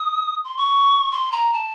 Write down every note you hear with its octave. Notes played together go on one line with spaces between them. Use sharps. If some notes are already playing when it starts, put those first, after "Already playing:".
Already playing: D#6
C6
C#6
C6
A#5
A5